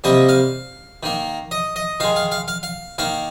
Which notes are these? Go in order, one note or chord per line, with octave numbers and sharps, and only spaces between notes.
C3 G3 A#3 D#5
F5
D#3 A#3
D#5
D#5
D#3 G#3 F5
F5
F5
F5
F5
D#3 A#3 F5